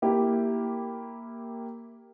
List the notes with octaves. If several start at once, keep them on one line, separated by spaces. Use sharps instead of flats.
A#3 E4 G4